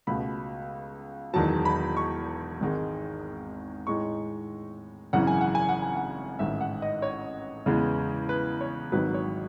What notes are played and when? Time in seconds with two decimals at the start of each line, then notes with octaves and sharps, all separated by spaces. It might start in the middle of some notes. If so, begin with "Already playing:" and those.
0.07 C#2 B2 A3 B5
1.34 E1 E2 D#3 F#3 A5
1.65 B5
1.97 C#6
2.60 G#1 G#2 D#3 G#3
3.87 A2 G#3 D#4 C#6
5.13 G#1 F#2 C#3 E3 F#5
5.27 G#5
5.41 F#5
5.55 G#5
5.69 F#5
5.82 G#5
5.96 F#5
6.39 A1 G#2 D#3 E5
6.61 F#5
6.82 D#5
7.02 C#5
7.66 E2 C#3 G#3 B3
8.29 B4
8.61 C#5
8.92 G#1 G#2 D#3 F#3 B4
9.14 C#5